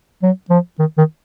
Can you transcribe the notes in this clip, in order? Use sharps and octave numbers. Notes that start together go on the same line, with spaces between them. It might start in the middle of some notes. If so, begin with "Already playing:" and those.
F#3
F3
D#3
D#3